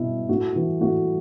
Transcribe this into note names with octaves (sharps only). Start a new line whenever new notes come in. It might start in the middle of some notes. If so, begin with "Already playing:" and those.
Already playing: B2 E4
A2 F#4
E3
A2 F#4